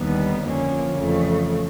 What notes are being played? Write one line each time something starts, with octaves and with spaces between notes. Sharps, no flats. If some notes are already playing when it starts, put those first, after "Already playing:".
Already playing: D#2 D3 G3 B3
F2 D3 F3 A#3 C#4
F2 C#3 E3 A3